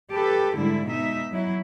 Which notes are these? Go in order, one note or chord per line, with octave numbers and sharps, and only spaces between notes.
G4 A4 B4
G#2 D3 G3 E4
B2 D#4 E5
F#3 E4